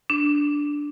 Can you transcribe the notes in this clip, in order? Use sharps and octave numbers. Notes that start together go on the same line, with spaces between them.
D4